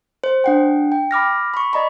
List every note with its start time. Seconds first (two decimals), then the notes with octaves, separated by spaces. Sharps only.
0.24 C5
0.44 D4 F#5 G5
0.92 G5
1.11 B5 D6 F6 A#6
1.54 B5 C#6
1.73 D5 D#5 A#5 B5